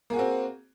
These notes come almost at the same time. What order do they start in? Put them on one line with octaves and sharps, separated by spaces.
A#3 G#4 F#4 C4